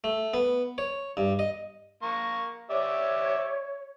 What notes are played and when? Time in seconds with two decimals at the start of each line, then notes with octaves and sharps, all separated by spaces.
0.04 A3
0.34 B3
0.78 C#5
1.17 G2
1.39 D#5
2.03 A#3 C#6
2.70 G4 C#5 D5 E5